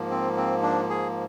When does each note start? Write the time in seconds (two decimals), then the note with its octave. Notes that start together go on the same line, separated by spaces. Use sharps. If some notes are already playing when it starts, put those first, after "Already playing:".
Already playing: G#2 F3 A#3
0.10 C4
0.37 C4
0.63 D4
0.89 G#4